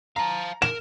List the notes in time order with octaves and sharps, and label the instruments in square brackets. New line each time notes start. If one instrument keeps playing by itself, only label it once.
[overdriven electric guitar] F5 A5 [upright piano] A#5
[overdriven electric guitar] A#4 [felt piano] E7